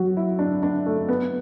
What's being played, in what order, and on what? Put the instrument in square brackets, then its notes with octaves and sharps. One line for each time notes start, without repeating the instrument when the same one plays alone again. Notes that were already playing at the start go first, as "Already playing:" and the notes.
Already playing: [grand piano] F#3 [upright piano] F#4
[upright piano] E4
D4
D4
A3
B3